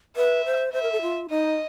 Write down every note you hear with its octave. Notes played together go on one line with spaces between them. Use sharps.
B4 E5
C5
C5 E5
A#4
A4
F4
D#4 D#5